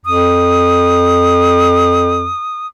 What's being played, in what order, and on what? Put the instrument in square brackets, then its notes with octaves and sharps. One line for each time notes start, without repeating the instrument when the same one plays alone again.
[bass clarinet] F2 [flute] D#6